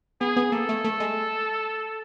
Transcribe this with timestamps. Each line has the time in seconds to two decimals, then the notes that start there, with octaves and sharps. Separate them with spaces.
0.21 B3 G#4
0.36 B3
0.52 A#3 A4
0.69 A3
0.84 A3
1.00 G#3